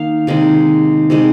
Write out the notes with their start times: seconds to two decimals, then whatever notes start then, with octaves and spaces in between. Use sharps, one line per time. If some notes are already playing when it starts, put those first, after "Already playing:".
Already playing: D#3 A#3 F5
0.27 C3 D#3 G#3
1.10 C3 D#3 G#3